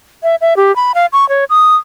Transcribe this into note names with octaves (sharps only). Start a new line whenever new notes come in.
E5
E5
G4
B5
F5
C#6
C#5
D#6